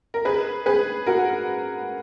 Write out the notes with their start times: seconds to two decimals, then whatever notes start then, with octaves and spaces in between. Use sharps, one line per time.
0.14 A#4
0.25 G#4 B4
0.66 G#4 B4
1.06 F#4 A#4